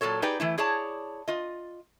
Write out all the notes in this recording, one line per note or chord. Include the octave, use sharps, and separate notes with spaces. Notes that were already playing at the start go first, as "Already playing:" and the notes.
A#2 E3 F#3 A4 C#5
D#4 G4 G#4 B4 D5 G5
E3 A3 E4
E4 G#4 C#5 D5 A5
F4 D#5